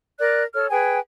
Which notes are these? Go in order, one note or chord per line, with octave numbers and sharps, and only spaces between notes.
A#4 D5 F#6
A4 C#5 F6
G#4 B4 G5 G#5